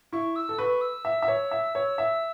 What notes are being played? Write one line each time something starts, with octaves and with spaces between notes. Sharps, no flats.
E4 C#6
E6
A4
B4 C#6
E6
E5
E5
C#5
E5
C#5
E5